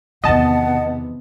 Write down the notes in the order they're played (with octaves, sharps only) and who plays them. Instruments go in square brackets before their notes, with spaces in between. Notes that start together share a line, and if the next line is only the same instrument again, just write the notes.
[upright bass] E2 D#3 [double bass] C3 B3 [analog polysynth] D#5 A5 [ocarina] F#5